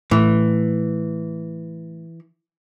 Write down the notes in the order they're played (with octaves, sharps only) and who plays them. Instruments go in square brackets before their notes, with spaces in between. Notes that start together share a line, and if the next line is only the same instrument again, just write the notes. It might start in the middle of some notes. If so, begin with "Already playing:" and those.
[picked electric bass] A2 [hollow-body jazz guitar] E3